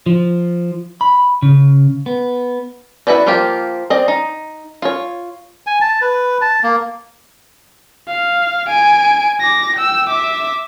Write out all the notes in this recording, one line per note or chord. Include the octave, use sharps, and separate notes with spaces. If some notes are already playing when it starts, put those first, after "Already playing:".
F3
B5
C#3
B3
E4 F#4 B4 C5 D5
F3 A#3 F4 G4
C4 D5 D#5
D#4
F4 C#5
G#5
A5
B4
A5
A#3
F5
G#5 D7
D6 A#6
G5 E6
E5 D6